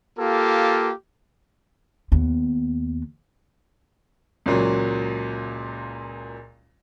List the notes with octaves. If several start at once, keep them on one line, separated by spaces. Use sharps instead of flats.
A#3 F4 G4 A4
D#2 B3
C#2 A#2 F#3